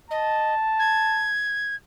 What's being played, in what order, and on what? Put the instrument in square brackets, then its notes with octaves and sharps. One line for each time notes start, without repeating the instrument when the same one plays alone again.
[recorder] D#5 [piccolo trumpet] A5
[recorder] G#6